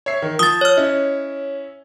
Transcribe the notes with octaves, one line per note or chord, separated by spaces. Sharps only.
C#5 E5 C7
D#3
F3 D#6 A6 G7
C#5 F6
C#4 E4 D#5